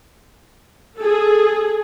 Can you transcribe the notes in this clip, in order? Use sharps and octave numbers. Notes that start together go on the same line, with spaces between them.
G#4 A4